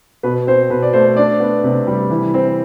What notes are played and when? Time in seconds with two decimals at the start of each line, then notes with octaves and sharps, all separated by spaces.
0.23 B2 B4
0.47 C4 C5
0.70 B2 B4
0.83 D5
0.93 A3 C5
1.17 D4 D5
1.40 B3
1.64 C3
1.87 G3
2.10 E3
2.34 C4